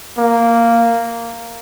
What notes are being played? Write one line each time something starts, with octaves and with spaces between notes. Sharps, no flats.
A#3